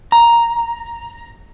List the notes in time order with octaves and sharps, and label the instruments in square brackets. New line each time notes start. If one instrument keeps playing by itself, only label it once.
[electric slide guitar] A#5